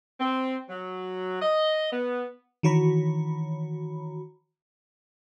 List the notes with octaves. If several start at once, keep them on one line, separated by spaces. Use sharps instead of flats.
C4
F#3
D#5
B3
D#3 E3 F#4 C#5 A#5 B5